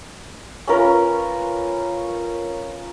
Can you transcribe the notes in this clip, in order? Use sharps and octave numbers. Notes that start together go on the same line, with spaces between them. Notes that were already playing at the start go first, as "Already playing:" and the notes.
C#4 F4 A#4 B4